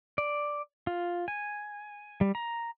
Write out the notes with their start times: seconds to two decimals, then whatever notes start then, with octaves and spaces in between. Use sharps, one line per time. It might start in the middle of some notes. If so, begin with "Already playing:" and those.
0.18 D5
0.87 F4
1.28 G#5
2.21 G3
2.35 A#5